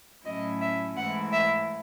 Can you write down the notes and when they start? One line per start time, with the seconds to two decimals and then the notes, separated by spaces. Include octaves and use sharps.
0.24 A2 F#3 A3 C#4 E4 D#5
0.61 E5
0.96 G#2 E3 A3 E4 F#5
1.32 E5